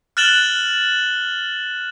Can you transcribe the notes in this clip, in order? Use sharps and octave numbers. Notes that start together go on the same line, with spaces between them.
F6 F#6 A6 E7 F#7 G7